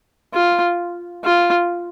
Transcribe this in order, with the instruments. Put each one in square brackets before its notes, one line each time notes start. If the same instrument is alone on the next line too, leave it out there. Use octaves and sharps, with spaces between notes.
[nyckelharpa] F4
F4